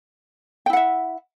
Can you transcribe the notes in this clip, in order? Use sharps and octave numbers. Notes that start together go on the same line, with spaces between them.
E4 E5 F#5 G5